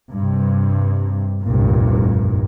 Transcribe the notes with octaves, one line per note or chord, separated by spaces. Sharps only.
G2 C3
F1 C2 G2 A#2